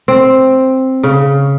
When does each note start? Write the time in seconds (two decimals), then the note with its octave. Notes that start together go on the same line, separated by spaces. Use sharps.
0.08 C4
1.03 C#3